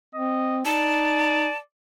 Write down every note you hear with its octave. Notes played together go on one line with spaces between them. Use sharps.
C4 D#5
D#4 D5 A5